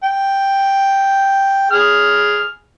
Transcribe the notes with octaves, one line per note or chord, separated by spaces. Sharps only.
G5
G#4 F6